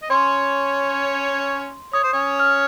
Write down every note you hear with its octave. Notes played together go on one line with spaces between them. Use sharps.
D#5
C#4 C#5 C6
C#5 D#6
C5
C#4 C#5
F6